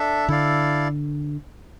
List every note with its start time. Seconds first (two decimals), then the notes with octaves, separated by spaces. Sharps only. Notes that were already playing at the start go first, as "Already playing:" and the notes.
Already playing: D4 A4 E5
0.28 D3 E4 A4 D5 F5